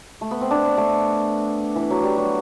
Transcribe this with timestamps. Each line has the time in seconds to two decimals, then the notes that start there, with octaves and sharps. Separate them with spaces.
0.21 A3
0.31 B3
0.41 C4
0.51 D4
0.64 B3
0.77 A3
1.76 E3
1.90 F#3
2.03 G3
2.18 F#3